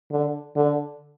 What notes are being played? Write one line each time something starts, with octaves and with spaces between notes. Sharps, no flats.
D3
D3